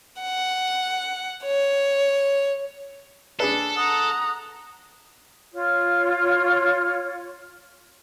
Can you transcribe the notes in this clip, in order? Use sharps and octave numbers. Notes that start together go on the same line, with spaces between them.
F#5
C#5
D4 G#4 A4 B4
F#5 A#5 D#6
F4 C#5